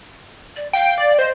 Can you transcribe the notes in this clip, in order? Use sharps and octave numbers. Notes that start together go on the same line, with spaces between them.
D5
F5 G5
D5
C5 D#5